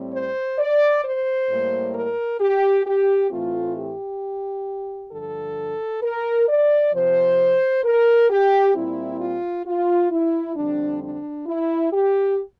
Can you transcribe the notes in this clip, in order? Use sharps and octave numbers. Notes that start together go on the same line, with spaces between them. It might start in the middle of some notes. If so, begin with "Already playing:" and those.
Already playing: A2 G3 C4
C5
D5
C5
A2 G3 A#3
A#4
G4
G4
A2 E3 A3 C4 F4
G4
G2 D3 F3 A4
A#4
D5
F2 C3 F3 C5
A#4
G4
A#2 G3 C4 E4
F4
F4
E4
F2 D3 G3 C4 D4
D4
E4
G4